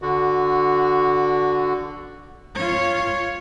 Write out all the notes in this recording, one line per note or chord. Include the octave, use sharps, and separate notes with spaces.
D3 F#4
F4 C#5